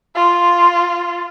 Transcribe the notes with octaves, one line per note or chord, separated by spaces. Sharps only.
F4